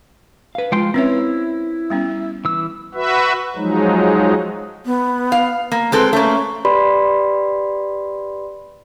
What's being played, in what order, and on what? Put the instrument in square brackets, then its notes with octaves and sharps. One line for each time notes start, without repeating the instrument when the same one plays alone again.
[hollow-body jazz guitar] B4 F5
[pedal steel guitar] F3 G5 C6 [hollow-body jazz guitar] G#3 F4
[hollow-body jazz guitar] C4 C#5 [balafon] C#4 B4 E5 [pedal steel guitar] E4
[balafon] G3 B3 C#4
[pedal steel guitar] E3 E6
[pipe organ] F#4 B4 E5
F3 F#3 G#3 D#4
[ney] B3
[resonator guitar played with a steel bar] F5
A#3
[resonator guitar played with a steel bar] G#3 C4 A4 [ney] B4
[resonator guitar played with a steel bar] A3 A#3 [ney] C#4
[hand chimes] G4 B4 D5 B5 C6